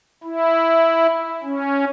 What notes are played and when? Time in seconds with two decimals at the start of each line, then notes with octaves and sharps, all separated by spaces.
0.24 E4
1.43 C#4